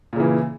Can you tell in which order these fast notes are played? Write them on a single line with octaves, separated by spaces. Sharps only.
A#2 C#3 E3